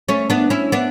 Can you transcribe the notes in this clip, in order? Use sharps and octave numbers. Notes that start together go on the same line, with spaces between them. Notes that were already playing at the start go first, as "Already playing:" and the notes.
A3 C#4
B3 D4
C#4 E4
B3 D4